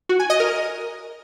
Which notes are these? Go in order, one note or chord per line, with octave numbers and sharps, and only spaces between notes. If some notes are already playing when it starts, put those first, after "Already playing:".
F#4
G#5
D#5
A#4